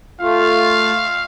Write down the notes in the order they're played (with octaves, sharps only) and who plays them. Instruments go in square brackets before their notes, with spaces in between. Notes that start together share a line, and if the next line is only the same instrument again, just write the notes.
[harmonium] A3 F4 [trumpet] F5